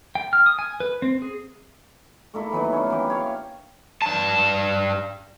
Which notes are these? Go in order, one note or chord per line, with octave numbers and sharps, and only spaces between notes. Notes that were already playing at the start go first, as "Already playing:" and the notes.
G5
F6
D#6
G#5
B4
C4
G#4
A3 A#3 E4 A4
E3 F#3 B3 D#4
C#4 D4
E3 A#3 G4
C#5 F5
G2 A5